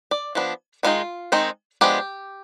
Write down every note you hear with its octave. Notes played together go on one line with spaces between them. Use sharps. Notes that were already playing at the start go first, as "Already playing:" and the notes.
D5
F3 B3 D4
D#3 G#3 C4 D#4 F4
D#3 G#3 C4 D#4
F3 G#3 B3 D4 G4